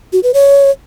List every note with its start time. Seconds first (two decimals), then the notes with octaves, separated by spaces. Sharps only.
0.13 F#4
0.23 B4
0.34 C#5